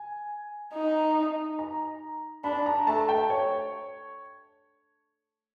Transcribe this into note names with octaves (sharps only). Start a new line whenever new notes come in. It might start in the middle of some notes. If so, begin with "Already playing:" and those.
Already playing: G#5
D#4
A#5
D4 B5
A#5
A3 A5
G5
C#5